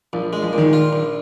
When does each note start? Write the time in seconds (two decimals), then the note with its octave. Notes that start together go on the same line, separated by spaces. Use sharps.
0.13 A#1 F3
0.33 G#3
0.42 F3
0.53 A#2 D#3
0.73 F4
0.93 A#1